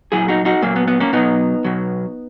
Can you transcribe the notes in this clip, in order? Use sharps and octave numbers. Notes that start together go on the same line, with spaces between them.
A#2 F#3 E4 G#4
D#4 F#4
D#4 F#4
A#2 F#3 A#3
B3
B3
A#3 C#4
B2 F#3 B3 D#4
B2 F#3